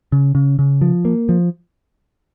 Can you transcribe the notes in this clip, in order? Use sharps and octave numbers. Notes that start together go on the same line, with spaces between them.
C#3
C#3
C#3
F3
A#3
F3